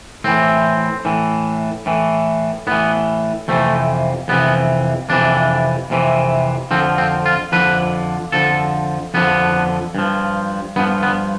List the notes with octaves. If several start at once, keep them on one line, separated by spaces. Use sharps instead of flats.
A2 E3 C4
A2 E3
A2 E3
A2 E3 B3
F2 C3 E3 A3
F2 C3 E3 B3
F2 C3 E3 D4
F2 C3 E3
F2 D3 F3 C4
C4
F4
F2 D3 F3 B4
F2 D3 F3 A4
F2 D3 F3 B3
G2 F3
G2 F3 B3
B3